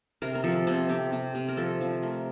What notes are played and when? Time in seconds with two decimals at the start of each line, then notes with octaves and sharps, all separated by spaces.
0.22 C3 A#4
0.35 A#4
0.44 F3 A4
0.67 C3 A4
0.89 C4 G4
1.12 C3
1.35 C3
1.48 A#4
1.57 F3 A4
1.81 F3
2.02 A3 A#4